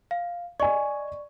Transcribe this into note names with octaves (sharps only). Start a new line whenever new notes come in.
F5
D5 D#5 G#5 C#6